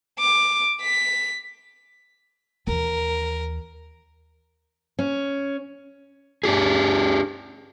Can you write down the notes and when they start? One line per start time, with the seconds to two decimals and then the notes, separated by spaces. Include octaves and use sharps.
0.20 D6
0.82 B6
2.67 D#2 E3 A#4
4.99 C#4
6.44 D4 G4 G#4